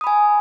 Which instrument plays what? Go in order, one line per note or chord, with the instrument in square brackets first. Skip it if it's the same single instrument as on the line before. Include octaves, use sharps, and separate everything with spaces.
[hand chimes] D#6
B5
G#5